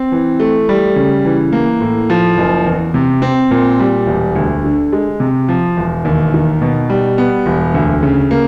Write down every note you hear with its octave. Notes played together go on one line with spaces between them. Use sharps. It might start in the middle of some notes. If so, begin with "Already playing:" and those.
Already playing: C4
E3
A3
G3
C#3
E3
A#3
A2
F3
F#1
E2
C3
C4
A#2
G3
E1
D2
D3
G#3
C3
F3
E1
D#2
D#3
B2
G3
B3
E1
D2
C#3
A#3